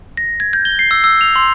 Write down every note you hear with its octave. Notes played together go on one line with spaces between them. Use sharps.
A#6
G#6
G6
G7
C7
E6
E6
F7
C6